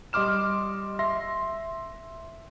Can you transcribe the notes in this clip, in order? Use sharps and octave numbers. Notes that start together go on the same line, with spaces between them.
G3 D#5 C6 D6 F6 E7
E5 C6 A#6